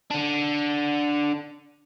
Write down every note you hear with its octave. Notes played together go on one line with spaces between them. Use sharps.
D3 D4